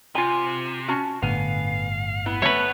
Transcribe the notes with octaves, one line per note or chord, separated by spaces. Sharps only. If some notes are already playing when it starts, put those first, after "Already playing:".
C3 F4 G#5
C#4 F#4 A5
G1 A2 D3 B3 F5 G#5
B3 E4
A3 B4 C#5